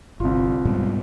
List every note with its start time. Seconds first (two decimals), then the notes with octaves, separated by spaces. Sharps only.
0.20 G1 C2 F4
0.65 G#2 B2 G3